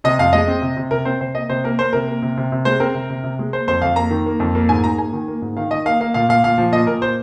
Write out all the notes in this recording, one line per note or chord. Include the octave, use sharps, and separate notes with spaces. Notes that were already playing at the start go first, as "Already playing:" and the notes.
C3 D#5
F2 F5
G#3 D#5
C4
C3
C3
C3 A#4
C4 C5
C3 C5
A#3 D#5
C3 C5
A#3 A#4
A#3 C5
C3 A#4
A#3
C3
C3
C3
G#3 C5
C4 A#4
C3
C3
C3
G#3
A#3 C5
F2 C5
F2 F5
A#3 A#5
D#3
A#3
F2
A#3
G#2 G#5
G#2 A#5
A#3 G#5
D#3
A#3
G#2
D#3 F5
D#3 D#5
A#3 F5
A#3 F5
A#2 F5
A#2 F5
A#2 F5
F3
A#2 D#5
A#2 A#4
A#3 C5